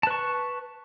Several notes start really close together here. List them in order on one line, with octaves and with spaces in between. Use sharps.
A5 B4 C#6